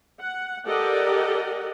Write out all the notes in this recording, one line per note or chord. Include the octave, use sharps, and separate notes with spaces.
F#5
G4 A4 A#4 D5 D#5 F#5